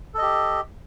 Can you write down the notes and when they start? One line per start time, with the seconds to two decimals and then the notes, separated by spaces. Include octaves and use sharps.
0.14 A4
0.18 D#5
0.22 G4